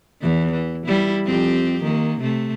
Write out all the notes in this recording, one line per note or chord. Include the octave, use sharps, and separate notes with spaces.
E2 E3
E3
G3 E4
F2 C4 G4
D#3 A#3
C3 A3